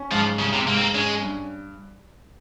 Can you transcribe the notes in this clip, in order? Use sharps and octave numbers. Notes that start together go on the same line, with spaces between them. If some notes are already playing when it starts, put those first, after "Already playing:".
Already playing: C#4
G#2 F3
C#3 G3
C3
G#2 A#3
C4
A#3
G#3 C#4
G2